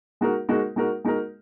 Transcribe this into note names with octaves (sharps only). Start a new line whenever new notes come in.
G#3 D#4 F#4 A#4
G#3 D#4 F#4 A#4
G#3 D#4 F#4 A#4
G#3 D#4 F#4 A#4